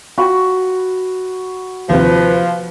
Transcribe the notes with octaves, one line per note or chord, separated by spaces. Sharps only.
F4 F#4 G5 B5
D#2 C3 F3 B4